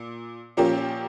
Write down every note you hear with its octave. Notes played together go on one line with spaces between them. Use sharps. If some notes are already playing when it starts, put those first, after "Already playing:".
Already playing: A#2
A#2 F3 A#3 C#4 G4